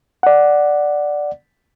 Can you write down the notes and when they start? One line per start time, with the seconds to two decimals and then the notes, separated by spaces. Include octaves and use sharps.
0.23 D5 F#5